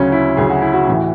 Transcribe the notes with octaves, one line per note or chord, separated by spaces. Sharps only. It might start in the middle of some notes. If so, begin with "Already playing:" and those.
Already playing: D2 C#3 F#3 C#4
E4
D2 C#3 F#3 G#4
F#4
E4
F#4
A1 A2 E3